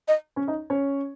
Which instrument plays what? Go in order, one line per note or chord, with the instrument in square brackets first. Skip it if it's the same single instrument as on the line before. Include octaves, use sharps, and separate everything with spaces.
[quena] D#5
[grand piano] C#4 C#5
D#4 D#5
C#4 C#5